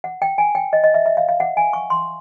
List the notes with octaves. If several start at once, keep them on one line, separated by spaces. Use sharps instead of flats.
F#5
G5
G#5
G5
D#5
D#5
E5
E5
F5
F5
F#5
G#5
C#6
C6